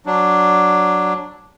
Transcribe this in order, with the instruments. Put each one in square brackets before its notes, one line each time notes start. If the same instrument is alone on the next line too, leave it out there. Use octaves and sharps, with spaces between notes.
[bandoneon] F#3 D4